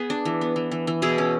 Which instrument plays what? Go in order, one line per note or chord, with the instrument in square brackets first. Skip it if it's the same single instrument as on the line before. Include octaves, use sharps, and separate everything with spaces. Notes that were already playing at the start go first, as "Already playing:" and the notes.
Already playing: [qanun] B3 G#4 B4
D4
E3
B3
E3
E3
E3
B2 E4 G#4
C#4